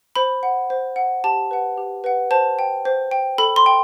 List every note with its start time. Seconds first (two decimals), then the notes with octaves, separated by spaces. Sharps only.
0.16 C5 B5
0.43 F#5
0.70 C5
0.96 F#5
1.24 G4 A5
1.51 B4 F#5
1.78 G4
2.04 B4 F#5
2.31 C5 A5
2.59 G5
2.85 C5
3.11 G5
3.38 A4 B5
3.56 C6
3.66 G5